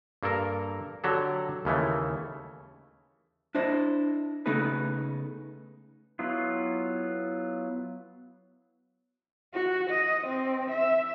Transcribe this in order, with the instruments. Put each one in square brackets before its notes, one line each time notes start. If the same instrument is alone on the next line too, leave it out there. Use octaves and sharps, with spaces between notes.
[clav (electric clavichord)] G2 A#3 A4 A#4 A#5
D3 F#3 G4 A4
D#2 C#3 E3 A3
[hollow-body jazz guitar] D4 E4 C5 D#5
C#3 A3 B3 D#4 G#4 B4
[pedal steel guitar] F#3 B3 E4 F4
[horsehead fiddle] F#4
D#5
C4
E5